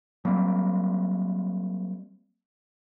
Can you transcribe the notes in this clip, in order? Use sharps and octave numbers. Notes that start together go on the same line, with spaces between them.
F#3 G3 A#3 C4